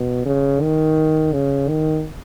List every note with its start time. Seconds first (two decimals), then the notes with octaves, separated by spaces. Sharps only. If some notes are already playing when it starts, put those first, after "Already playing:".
Already playing: B2
0.25 C#3
0.61 D#3
1.33 C#3
1.69 D#3